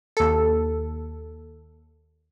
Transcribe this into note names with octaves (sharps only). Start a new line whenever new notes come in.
D#2 A4